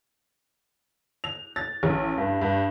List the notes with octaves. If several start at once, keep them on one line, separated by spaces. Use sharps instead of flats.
F7
A6
A1
G2
G2